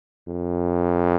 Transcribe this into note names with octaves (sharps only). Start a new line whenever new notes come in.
F2